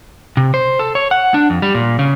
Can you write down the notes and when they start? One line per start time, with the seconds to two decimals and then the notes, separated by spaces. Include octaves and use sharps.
0.37 C3
0.54 C5
0.79 A4
0.95 C#5
1.11 F#5
1.34 D4
1.50 F2
1.62 G3
1.74 A#2
1.99 C#3